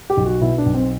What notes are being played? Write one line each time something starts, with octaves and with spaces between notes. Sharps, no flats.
G4
B1
F#4
B2 E4
D4
B1
C4